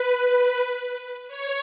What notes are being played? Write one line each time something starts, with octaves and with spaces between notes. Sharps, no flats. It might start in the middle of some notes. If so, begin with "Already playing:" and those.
Already playing: B4
B4
C#5